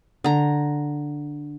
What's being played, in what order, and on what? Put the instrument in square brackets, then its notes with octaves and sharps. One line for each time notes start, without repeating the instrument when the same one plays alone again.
[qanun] D3 A#5